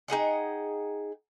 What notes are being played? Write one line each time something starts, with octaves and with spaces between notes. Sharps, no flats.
D#4 G#4 F#5 G5